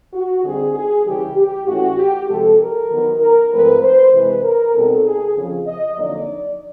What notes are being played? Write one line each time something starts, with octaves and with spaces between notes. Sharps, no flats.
F#4
D3 G3 C4 D#4 G#4
G#4
C#3 E3 G3 G4
G4
A2 E3 A3 C#4 F#4
G4
C3 F3 G#3 A4
A#4
D#3 F#3 B3 D#4
A#4
G#2 F3 A3 C4 B4
C5
C3 E3 G#3 B4
A#4
B2 G3 C4 D#4 A4
G#4
F2 C#3 F3
D#5
F2 D3 F#3 A#3 D#4 D5